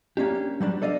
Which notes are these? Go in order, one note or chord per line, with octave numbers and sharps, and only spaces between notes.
A#3 C#4 D4 G4
F#3 G3 C#4 D4
A4 D5 D#5 F5